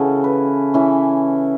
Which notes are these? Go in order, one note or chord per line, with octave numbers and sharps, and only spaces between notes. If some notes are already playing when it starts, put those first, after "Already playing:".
Already playing: C#3 E3 C#4 F#4 A4 F#5
B4
E3 C#4 E4